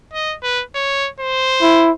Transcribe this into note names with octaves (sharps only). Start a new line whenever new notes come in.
D#5
B4
C#5
C5
E4